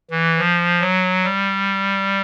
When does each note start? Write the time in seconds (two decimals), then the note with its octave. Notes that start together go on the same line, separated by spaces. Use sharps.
0.10 E3
0.39 F3
0.81 F#3
1.24 G3